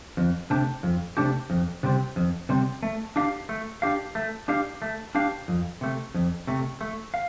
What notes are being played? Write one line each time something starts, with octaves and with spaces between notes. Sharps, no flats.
F2
C3 A3 D4 G4
F2
C3 A3 D4 G4
F2
C3 G3 C4
F2
C3 G3 C4
A3
D4 G4 F5
A3
D4 G4 F5
A3
D4 G4 F5
A3
D4 G4 F5
F2
C3 A3
F2
C3 A3
A3
F5